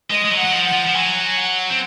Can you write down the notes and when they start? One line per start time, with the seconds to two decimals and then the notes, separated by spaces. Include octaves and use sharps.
0.10 G#3 D#5
0.25 G#3
0.32 F#3
0.38 F#5
0.45 F#3
0.52 F3
0.66 F#5
0.73 F3
0.87 F3
0.94 F#3 G#5
1.37 F#5
1.70 C4